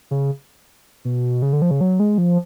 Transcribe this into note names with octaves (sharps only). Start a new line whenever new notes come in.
C#3
B2
C#3
D3
F3
C#3
F#3
G#3
F3